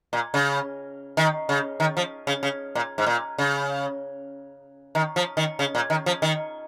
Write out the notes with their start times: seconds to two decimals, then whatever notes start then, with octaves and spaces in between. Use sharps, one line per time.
0.13 A#2
0.34 C#3
1.17 D#3
1.49 C#3
1.80 D#3
1.97 F3
2.27 C#3
2.43 C#3
2.75 A#2
2.98 G#2
3.07 A#2
3.38 C#3
4.95 D#3
5.16 F3
5.37 D#3
5.59 C#3
5.75 A#2
5.90 D#3
6.06 F3
6.22 D#3